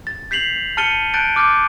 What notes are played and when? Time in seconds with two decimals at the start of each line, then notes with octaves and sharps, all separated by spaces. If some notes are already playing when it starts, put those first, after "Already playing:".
0.07 A6
0.31 G6 B6 C7 F7 F#7
0.77 A5 F6 A6 C#7 D#7 G7
1.14 A5 F#6 G6 A6 D7
1.36 D6 F6 G6 A6